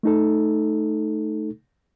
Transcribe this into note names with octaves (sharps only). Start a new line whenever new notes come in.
A3 D#4 A4